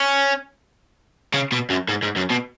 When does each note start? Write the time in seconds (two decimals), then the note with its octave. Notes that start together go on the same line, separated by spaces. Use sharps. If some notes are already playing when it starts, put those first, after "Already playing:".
Already playing: C#4
1.34 C#3
1.52 B2
1.70 F#2
1.88 G#2
2.02 G#2
2.16 F#2
2.30 B2